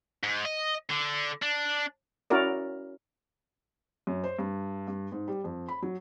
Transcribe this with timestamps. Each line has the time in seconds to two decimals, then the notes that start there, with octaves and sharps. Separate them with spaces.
0.24 G#2
0.45 D#5
0.90 D3
1.42 D4
2.30 C#4 E4 F#4 A#4 D5
4.07 F#2
4.24 C5
4.39 G2
4.88 G2
5.12 G#2
5.28 G3
5.44 F2
5.68 B5
5.83 F#3